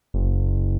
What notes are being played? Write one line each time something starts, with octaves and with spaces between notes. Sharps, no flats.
F#1